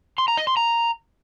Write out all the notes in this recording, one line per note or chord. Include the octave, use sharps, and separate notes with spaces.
C6
A#5
D#5
C6
A#5